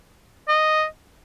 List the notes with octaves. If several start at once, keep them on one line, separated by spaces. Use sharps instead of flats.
D#5